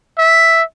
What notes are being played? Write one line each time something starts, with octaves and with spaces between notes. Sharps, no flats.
E5